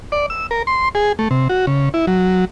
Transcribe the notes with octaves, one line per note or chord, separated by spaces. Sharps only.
D5
E6
A#4
C6
G#4
A3
C3
F#4
C#3
E4
F#3